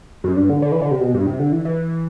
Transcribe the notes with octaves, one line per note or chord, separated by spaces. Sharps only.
F#2
G2
D3
D3
E3
D3
C3
B2
G2
C3
D3
E3
E3